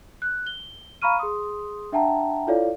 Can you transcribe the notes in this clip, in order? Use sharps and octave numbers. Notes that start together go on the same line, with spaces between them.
F#6
G7
F5 A#5 B5 C#6 F6 D#7
G#4 C6 D#6
D4 E5 F#5 G5 A5 A#5
E4 F4 A4 C#5 D5 F5